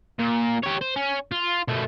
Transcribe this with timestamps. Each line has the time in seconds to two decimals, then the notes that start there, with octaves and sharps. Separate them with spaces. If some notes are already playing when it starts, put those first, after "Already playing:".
0.19 A#2
0.63 G4 C#5
0.81 C5
0.96 C#4
1.32 F4
1.68 B2 A3